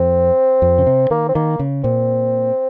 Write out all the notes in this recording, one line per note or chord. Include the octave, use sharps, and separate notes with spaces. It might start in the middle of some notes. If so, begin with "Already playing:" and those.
Already playing: F2 C4
F2
C#3
C3
D#3 A#3
C4
D#3 A#3
C#3
A#2 C4